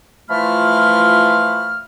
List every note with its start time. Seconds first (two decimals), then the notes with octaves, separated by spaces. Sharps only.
0.29 E3 F3 A3 F4 B5 F6